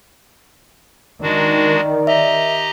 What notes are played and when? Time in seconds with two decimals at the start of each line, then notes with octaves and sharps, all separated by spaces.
1.22 D#3 G#3 D4 F#4 D5
2.07 G4 D#5 E5 A#5